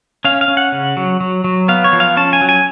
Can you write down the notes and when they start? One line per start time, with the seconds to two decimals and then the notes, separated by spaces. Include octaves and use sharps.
0.25 C#4 F5
0.41 F5
0.48 C#4
0.57 F#5
0.72 C#3
0.97 F#3
1.21 F#3
1.44 F#3
1.68 B3 F5
1.84 C#5
1.93 F3
2.00 F5
2.17 C#4 A5
2.33 G#5
2.41 F#3
2.49 G#5